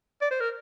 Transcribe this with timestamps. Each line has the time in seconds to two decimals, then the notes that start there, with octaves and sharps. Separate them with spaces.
0.21 D5
0.31 C5
0.41 A#4